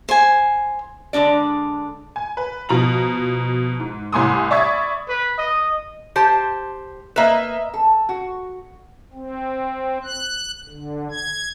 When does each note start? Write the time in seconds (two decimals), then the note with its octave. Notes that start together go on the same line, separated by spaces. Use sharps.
0.09 C5 G#5
1.13 D3 G#3 D4 D5
2.16 G#5
2.37 B4
2.69 B2 F3 A#5 F#7
3.80 G#2
4.12 C2 A2 G#5 C6 D6 D#6
4.51 D5 E5 B5 C#6 D#6 G#6
5.08 B4
5.38 D#5
6.16 G4 C5 A5
7.16 A#3 B4 D#5 E5 E7
7.74 A4
8.09 F#4
9.13 C4
10.04 F#6
10.68 D3
11.11 G#6